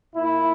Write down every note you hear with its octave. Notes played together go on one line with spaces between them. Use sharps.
A#2 E4